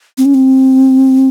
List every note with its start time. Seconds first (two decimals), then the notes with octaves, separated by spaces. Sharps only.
0.18 C4
0.25 C#4
0.34 C4